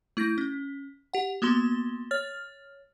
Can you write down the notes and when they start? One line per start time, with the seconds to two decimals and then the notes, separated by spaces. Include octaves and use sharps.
0.17 A3 E4 G6 A#6
0.38 C#4
1.13 G4 F#5
1.42 A#3 B3 F#4 C6 G7
2.11 C#5 F6 A6